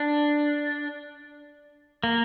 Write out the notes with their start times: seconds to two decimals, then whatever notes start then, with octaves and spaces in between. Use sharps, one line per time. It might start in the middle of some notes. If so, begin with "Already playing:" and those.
Already playing: D4
2.04 A#3